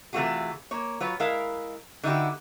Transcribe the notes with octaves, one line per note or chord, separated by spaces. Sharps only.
C3 E3 A3 F4 F#4 G#4
A#3 C#5
F#3 F4 B4 C#5
G#3 E4 A#4 F5
D3 D#4 E4 F#4 G4